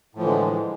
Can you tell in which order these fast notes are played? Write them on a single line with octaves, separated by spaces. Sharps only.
A2 F3 E3 D3 G#3